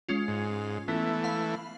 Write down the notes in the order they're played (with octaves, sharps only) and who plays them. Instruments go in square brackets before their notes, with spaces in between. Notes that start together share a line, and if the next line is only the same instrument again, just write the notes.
[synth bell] G#3 C#4 F4
[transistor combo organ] G#2
[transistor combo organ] E3 A3 [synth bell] B3
[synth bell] F5 B5